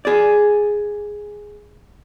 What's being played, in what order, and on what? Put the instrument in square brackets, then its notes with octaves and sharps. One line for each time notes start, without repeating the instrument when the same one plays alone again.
[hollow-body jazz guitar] G#4 D5